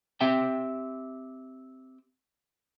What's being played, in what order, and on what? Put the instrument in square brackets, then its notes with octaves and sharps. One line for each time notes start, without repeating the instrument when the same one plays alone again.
[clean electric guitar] C4 G4 E5 G5